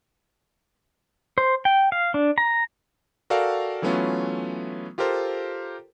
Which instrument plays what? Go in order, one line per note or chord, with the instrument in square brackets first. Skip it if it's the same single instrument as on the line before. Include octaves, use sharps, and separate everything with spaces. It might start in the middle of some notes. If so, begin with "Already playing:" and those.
[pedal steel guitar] C5
G5
F5
D4
A#5
[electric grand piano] F#4 A4 A#4 D5 F5 G5
E3 F#3 A3 B3 C#4 F4
F4 G4 A4 A#4 C5